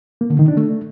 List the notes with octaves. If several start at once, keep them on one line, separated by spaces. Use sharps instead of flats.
A#3
D3
D#3
D4
A3